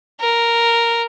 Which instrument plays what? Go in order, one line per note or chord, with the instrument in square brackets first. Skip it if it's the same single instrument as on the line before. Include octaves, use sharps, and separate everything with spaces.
[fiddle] A#4